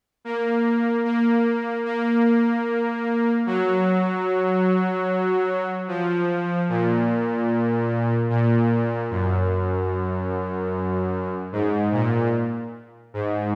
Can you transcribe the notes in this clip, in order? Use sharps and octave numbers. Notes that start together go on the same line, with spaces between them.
A#3
A#3
A#3
F#3
F3
A#2
A#2
F#2
G#2
A#2
G#2